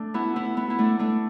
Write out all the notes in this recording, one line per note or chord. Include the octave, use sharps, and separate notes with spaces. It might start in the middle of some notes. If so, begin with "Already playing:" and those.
Already playing: A3 D4
B3 E4
B3 E4
B3 E4
E4
A3 D4
A3 D4